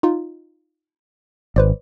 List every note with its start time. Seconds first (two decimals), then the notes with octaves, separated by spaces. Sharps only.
0.03 D#4 F4
1.56 G#1 B4 C5 D5